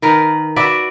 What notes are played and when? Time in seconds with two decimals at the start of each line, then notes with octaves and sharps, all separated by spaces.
0.02 D#3 A#4 B4
0.56 F#4 B4 D5 E5